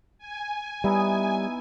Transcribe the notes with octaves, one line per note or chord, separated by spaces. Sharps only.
G#5
G3 B3 D#4 E4